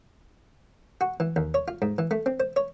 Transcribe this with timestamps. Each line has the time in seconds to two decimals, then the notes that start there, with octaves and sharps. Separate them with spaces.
1.01 F#4
1.20 E3
1.36 D#2
1.54 C#5
1.68 F4
1.82 G#2
1.98 E3
2.11 A3
2.26 C4
2.40 C5
2.56 C#5